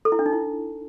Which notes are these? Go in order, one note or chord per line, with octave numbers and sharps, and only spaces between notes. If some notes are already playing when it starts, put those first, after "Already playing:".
A4
E4
D4
D#4
E4